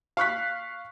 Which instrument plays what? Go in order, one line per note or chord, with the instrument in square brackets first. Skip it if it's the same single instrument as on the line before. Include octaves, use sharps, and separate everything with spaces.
[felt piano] F5 C#6 F#6 B6